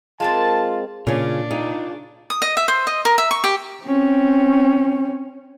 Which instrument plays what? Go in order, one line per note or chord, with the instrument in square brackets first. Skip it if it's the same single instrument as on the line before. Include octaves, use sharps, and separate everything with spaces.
[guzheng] G#3 A#3 C4 [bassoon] F4 [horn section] A5
[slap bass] A#2 [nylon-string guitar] C#3 C#4 [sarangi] D4 [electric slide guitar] F4
[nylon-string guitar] D#4 [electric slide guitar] F4 G#4
[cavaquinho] D#6
D#5
E5
C5
D#5
A#4
E5
C#6
G4
[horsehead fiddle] C4 C#4